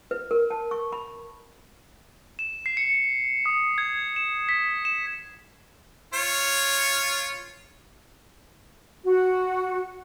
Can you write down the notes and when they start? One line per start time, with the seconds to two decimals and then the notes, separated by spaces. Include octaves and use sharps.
0.11 B4
0.31 A#4
0.50 A5
0.71 C#6
0.92 B5
2.39 E7
2.66 C7
2.77 C#7
3.46 D#6
3.78 G#6
4.16 E7
4.49 B6
4.85 E7
6.13 F4 C#5
9.04 F#4